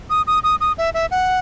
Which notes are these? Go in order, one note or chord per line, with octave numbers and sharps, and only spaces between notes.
D#6
D#6
D#6
D#6
E5
E5
F#5